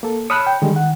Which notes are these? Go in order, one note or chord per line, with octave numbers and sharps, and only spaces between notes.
A#3 A4
C#5 A5 B5 D#6 F6 F#6
G5
D3 D#3 G3 G#3
F#5